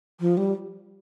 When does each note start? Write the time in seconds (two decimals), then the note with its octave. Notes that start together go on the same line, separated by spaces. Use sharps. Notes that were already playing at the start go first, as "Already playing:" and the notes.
0.20 F3
0.37 G3